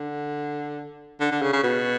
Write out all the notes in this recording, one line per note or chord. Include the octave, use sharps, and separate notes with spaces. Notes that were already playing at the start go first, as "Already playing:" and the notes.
Already playing: D3
D3
D3
C#3
C#3
B2